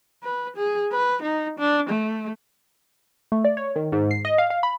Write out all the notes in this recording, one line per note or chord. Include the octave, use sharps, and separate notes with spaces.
B4
G#4
B4
D#4
D4
A3
A3
D5
C#5
D#3
G#2
C7
D#5
F5
F5
B5